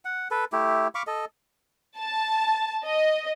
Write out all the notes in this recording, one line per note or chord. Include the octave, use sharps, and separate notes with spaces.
F#5
A4 B4
A3 E4 G4
F5 B5 C#6 D6
A4 D#5
A5
D#5